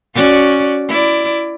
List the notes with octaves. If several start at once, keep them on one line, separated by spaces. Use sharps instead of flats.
C#4 F#4 D5
E4 D5